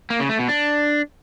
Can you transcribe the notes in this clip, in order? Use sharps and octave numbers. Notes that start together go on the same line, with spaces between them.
A#3
C#3
A3
B2
D4